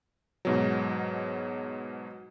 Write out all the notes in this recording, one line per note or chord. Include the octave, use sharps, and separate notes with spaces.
G#2 B2 F#3